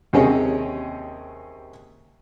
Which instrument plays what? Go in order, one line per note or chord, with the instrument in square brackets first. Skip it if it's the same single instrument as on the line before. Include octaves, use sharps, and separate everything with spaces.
[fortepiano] D#2 C3 C#4 G#4 C#5 D#5